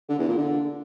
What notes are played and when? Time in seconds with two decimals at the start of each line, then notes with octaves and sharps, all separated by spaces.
0.09 D3
0.19 E2
0.28 A#2
0.38 D3